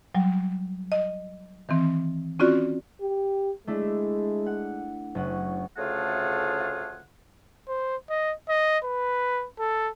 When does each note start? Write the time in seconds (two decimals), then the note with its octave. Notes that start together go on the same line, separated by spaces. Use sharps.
0.15 F#3 G3
0.92 D#5
1.69 D#3 E3 C4
2.39 C4 C#4 F4 F#4 D5
3.01 G4
3.67 G#3 A3 D4 E4
4.46 F#5
5.15 F#1 C#4 F#5
5.77 D2 C#3 A3 F4 G#4 F#5
7.68 C5
8.10 D#5
8.49 D#5
8.84 B4
9.59 A4